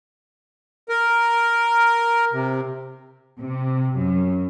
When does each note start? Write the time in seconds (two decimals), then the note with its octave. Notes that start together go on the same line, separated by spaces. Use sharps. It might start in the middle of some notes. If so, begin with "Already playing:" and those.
0.89 A#4
2.33 C3
3.39 C3
3.96 F#2